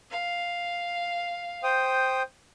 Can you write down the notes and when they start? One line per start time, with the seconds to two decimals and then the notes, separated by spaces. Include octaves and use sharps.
0.11 F5
1.63 C5 G5 D#6